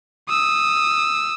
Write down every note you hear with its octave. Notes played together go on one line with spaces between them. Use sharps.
D#6 E6